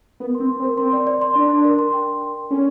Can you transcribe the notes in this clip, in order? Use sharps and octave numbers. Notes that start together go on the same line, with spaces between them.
B3 A#4
C6
C4
C6
C4
A#4
C4 C6
D5
D5
C6
D4 D5
C6
A#4
C6
G5
G5
C6
A#4
C#4 A4